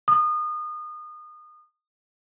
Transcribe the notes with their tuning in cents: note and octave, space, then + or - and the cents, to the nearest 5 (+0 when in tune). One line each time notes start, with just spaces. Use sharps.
D#6 -30